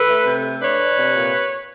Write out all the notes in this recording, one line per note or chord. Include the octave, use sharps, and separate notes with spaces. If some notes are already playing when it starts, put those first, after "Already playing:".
Already playing: A4 B4
A3
C3
A3
D4 B4 C#5
D4
C3
A#2